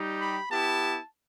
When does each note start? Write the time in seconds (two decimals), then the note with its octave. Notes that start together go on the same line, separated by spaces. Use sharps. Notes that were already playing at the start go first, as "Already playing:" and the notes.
Already playing: G3 D#4 G4
0.20 B5
0.50 B3 E4 G4 A5